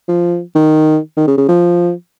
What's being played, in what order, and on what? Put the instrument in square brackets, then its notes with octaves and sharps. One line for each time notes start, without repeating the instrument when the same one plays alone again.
[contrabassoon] F3
D#3
D#3
C#3
C#3
F3